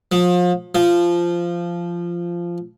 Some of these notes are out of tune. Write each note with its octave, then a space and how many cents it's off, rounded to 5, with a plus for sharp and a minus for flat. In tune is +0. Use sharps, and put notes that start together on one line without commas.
F3 +30
F3 -15